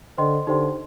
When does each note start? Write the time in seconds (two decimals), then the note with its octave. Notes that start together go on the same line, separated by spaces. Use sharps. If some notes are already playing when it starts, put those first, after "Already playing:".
0.18 D3 C5 D#5 G5 C6
0.47 D3 D#4 G4 C5 G5 C6